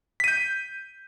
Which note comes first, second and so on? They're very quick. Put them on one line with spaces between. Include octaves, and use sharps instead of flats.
B6 D#7 G6